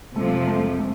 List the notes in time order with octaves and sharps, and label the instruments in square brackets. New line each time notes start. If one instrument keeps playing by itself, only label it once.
[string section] F2 C3 F3 [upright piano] A3 A4
[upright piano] A3 A4
A3 A4